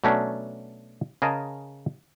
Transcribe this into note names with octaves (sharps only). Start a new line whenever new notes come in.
B2 F#3 A3 C#4 D4
C#3 G#4 A#4 D#5 A5